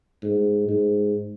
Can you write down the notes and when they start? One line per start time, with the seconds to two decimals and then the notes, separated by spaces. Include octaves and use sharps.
0.23 G#2
0.68 G#2